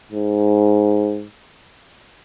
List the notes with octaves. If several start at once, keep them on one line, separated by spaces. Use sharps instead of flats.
G#2